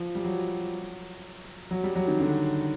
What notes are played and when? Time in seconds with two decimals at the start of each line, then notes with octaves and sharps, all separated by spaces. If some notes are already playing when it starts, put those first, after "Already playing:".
Already playing: F3
0.15 G3
0.25 F#3
1.71 F#3
1.83 G3
1.96 F#3
2.08 D#3
2.20 D3